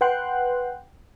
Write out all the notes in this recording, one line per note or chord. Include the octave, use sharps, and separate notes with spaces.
B4 F#5 G5 C6 F#6